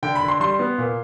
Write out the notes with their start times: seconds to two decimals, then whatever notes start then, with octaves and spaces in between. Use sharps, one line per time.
0.03 D3 G5
0.15 B5
0.22 D3
0.28 C6
0.40 G3 C6
0.59 B3
0.78 A#2